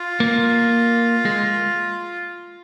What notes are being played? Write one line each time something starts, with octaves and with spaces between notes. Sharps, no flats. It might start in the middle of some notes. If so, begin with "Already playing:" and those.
Already playing: F4
A#3
G#3